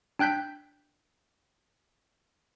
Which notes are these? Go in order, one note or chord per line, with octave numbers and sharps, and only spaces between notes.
D4 G5 F#6 G6 B6